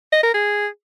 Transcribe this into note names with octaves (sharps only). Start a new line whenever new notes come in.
D#5
A#4
G#4